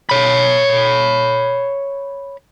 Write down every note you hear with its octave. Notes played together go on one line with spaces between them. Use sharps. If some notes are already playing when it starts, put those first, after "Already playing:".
C#5 B5